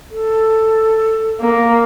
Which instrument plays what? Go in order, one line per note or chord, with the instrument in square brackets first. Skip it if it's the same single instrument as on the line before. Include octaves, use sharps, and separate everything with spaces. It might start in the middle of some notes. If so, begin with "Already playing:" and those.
[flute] A4
[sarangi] A#3